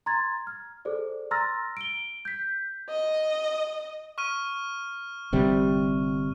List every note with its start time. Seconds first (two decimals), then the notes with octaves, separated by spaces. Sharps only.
0.06 A#5 C6 G#6 A6
0.47 F6
0.85 G#4 A4 C5 D5
1.31 A#5 C6 E6 F6 A6 A#6
1.77 D7 G7
2.25 G6 B6
2.89 D#5
4.18 C#6 F6 D#7
5.33 G1 C3 G3